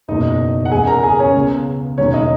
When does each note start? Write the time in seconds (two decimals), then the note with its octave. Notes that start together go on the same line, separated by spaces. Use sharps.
0.08 F#1 E2 B2 D#4 D#5
0.65 F#5
0.71 E2 C#3 G#3 G#4 G#5
0.87 A#4 A#5
1.03 G#4 G#5
1.19 C#4 C#5
1.35 C#2 C#3 G#3 B3
1.98 E1 D#2 C#3 F#3 C#4 C#5
2.13 D#4 D#5